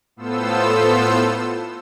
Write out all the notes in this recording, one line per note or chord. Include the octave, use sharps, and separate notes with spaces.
A2 B3 F4 A4 C5 E6